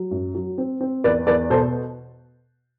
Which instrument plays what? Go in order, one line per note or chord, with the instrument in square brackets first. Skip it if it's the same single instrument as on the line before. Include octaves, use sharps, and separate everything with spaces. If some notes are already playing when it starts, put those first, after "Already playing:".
Already playing: [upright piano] F#3
F#2
F#3
C4
C4
E2 B4 D5
E2 B4 D5
B2 A4 C5